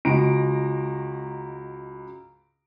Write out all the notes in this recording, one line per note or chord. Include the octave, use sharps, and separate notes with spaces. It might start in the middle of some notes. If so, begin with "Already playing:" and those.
C#2 F#4 A#5 D7